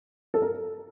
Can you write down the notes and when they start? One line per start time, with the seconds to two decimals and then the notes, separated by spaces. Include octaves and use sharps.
0.34 A4
0.42 A#4